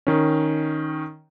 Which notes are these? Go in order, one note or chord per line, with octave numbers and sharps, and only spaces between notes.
D#3 C#4